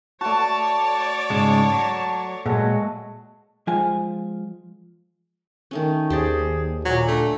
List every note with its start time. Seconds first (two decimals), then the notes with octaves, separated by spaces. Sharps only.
0.21 A3 F#4 C#5 D5 A5
1.30 G#2 C#3 G#3 A5
1.72 F#3
2.46 A#2 F#3 G#3 A3 A4 F#5
3.67 F3 G#3 F4 G#5
5.71 D#3 A3 C#4
6.10 D#2 G4 G#4 C5 D5
6.85 A#2 F#3
7.08 D3 A3